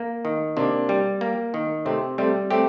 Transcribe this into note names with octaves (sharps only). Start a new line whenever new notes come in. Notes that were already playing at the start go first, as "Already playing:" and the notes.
Already playing: A#3
D#3
C3 A#3 D4
G3
A#3
D#3
C3 A3 C4
G3 A3 C4
A3 C4 G4